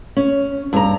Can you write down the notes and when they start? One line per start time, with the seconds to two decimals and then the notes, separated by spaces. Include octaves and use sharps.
0.17 C#4
0.73 G2 A#5